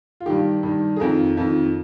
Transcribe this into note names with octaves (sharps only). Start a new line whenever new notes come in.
F4
G2 D#3 G4
G2 D#3
G#4
F2 D#3 A#4
F2 D#3